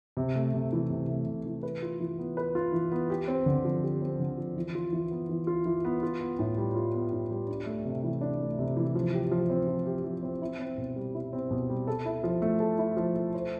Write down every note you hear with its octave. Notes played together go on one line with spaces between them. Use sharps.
C3
A3
C3
E3
C3
A3
C3
E3
B4
F4
E3
B3
B4
F4
E3
B3
G4
C4
D3
F3
G4
C4
D3
F3
E3
F4
E3
B3
E3
F4
E3
B3
F4
B3
A2
G3
F4
B3
A2
G3
D4
A3
C3
E3
D4
A3
C3
E3
F3
G4
F3
C4
F3
G4
F3
C4
E4
C4
B2
G3
E4
C4
B2
G3
A4
E4
F3
A3
A4
E4
F3
A3
C5